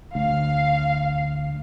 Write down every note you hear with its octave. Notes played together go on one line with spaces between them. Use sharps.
D2 F5